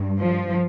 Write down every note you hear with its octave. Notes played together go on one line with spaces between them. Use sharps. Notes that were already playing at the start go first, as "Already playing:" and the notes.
Already playing: G2
F3